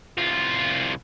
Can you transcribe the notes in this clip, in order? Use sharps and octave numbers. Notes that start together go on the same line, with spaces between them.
C2 F4